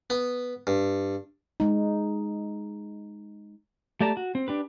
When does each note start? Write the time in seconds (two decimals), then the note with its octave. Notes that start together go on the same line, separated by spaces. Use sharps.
0.10 B3
0.67 G2
1.60 G#3 D#4
4.01 A3 G4 D5 A5 A#5
4.17 F#4
4.35 C4
4.48 D4 G4 B4